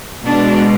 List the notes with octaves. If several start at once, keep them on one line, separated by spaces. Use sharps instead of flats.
B2 G#3 D4